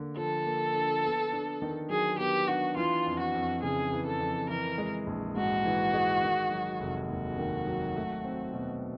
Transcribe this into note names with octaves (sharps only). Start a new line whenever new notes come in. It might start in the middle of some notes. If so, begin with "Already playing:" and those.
Already playing: D3 A#3 D4
F3 A4
A#3
D4
B3
D4
D#3
F#3 G#4
B3 G4
D4 F#4
E3 F4
F2
F#4
F2
C#3 G#4
E3
A4
F2
E3 A#4
G#3
A#1
G#2 F#4
E3
G#3
D#3
F#3
F1
D#2 F#4
D#3
F#3
A3
C4
B2